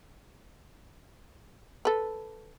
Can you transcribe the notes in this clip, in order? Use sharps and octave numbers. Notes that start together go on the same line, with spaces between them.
A4 B4